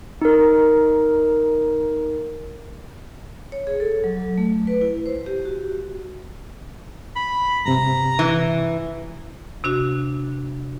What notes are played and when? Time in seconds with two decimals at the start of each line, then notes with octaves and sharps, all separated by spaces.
0.22 D#4 A#4
3.52 C#5
3.67 G#4
3.80 A4
4.04 F#3
4.17 F#3
4.38 A3
4.67 B4
4.81 E4
5.06 C5
5.26 G4
5.45 F#4
7.16 B5
7.66 G2 C3 A#5
8.19 E3
9.64 C3 D4 F#4